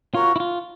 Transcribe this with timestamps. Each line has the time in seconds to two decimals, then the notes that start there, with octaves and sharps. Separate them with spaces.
0.14 F4 F#4 A#4 C#5
0.36 E4
0.40 F4